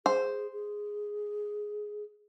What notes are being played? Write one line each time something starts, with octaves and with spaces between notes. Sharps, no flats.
G#4 C5
G#4